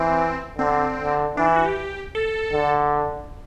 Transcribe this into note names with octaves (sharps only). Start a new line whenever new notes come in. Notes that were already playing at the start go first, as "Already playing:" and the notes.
Already playing: E3 C4
D3 C4
D3
E3 D4
E4
F#4
G4
A4
D3